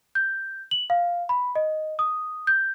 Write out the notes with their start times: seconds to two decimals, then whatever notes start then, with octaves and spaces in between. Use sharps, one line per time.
0.15 G6
0.71 F#7
0.90 F5
1.29 B5
1.55 D#5
1.99 D#6
2.47 G6